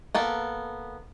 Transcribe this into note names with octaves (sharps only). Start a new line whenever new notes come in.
A#3 B3 A4